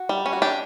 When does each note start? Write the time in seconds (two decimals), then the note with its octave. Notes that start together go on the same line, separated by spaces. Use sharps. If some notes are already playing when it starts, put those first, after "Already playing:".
Already playing: F#4
0.09 G3
0.26 C#4
0.33 F#4
0.42 D4 G4